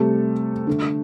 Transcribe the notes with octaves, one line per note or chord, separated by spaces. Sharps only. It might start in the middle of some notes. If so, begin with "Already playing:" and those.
Already playing: C3 G3 A3 A4
D3 A3